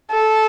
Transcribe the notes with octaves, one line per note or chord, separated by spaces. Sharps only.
A4